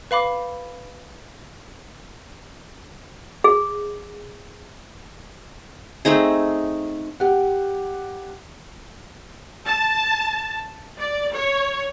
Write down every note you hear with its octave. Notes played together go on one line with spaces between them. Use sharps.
B4 F5 B5 D6
G#4
A3 C4 D#4 G#4
G4 F#5
A5
D5
C#5